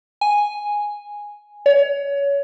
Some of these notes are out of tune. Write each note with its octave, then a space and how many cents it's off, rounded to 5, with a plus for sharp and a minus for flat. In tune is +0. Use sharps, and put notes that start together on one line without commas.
G#5 -5
C#5 +25